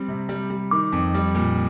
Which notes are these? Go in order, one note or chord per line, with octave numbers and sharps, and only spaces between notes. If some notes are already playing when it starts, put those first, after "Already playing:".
Already playing: G3 C4
C3
G3
G3
D#3 D6
F2
G3
A#2